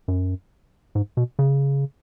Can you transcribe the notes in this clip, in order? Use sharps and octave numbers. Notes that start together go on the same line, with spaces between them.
F#2
G#2
B2
C#3